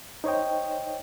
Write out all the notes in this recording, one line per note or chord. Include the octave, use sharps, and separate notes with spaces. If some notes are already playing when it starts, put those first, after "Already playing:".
D#4 C5 C#5 D#5 G5